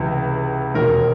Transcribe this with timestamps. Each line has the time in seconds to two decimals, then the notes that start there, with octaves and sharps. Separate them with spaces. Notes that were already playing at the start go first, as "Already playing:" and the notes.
Already playing: C#2 C3 E3
0.74 E1 D#2 D#3 A#4